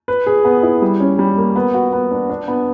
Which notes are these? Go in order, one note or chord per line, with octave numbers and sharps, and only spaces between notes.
B4
G#4
B3
E4
G3
C#4
G3
A#3
B3
F#4
B3
D4
D4
B3